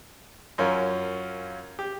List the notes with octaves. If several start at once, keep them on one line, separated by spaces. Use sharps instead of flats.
F#2 C#4 F4 A#4
G4